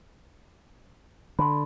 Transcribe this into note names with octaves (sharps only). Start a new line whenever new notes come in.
D3 B5 C6